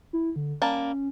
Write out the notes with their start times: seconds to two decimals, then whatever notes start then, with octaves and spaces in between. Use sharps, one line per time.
0.13 E4
0.36 D3
0.62 G3 A#3 C#4 A5